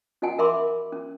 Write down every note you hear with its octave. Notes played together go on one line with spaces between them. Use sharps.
C#4 F#4 D#5 F#5 G#5
A#4 E5 B5 C6 D6
C#4